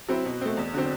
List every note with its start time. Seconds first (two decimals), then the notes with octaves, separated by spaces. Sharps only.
0.09 F#3 C4 E4
0.25 B2
0.41 A3 C4
0.57 E2
0.74 D3 F#3 C4